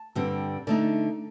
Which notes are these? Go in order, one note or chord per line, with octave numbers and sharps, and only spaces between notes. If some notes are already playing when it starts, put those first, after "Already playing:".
Already playing: A5
G2 D3 G3 C4
D3 A3 D#4 A5